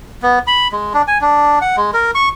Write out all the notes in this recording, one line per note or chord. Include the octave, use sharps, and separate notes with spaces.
B3
B5
G#3
D4
G#5
D4
F#5
G#3
A#4
C#6